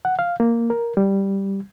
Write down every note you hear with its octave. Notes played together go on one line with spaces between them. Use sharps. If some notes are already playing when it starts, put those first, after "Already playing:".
F#5
F5
A#3
A#4
G3